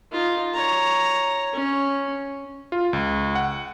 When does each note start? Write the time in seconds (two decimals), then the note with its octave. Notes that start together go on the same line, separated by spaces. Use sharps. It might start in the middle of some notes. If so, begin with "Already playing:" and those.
0.12 D#4 F4
0.54 C#5 A#5
1.53 C#4
2.72 F4
2.93 C#2
3.35 F#5